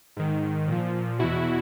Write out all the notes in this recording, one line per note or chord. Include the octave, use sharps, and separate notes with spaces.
G#2 D#3
A#2 F3
E2 B2 E4 F#4